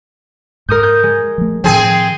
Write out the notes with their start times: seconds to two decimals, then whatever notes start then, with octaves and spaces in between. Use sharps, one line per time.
0.69 G#2 A#4 D#6 G6
0.83 G6
1.03 G#3
1.38 F3 A3
1.64 A2 D#3 F3 C4 G#4